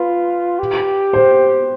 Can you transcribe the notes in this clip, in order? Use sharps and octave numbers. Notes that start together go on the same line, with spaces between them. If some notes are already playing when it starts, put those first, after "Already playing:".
Already playing: F4 B4
G4
C5